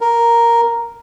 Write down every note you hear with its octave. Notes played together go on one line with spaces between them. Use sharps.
A#4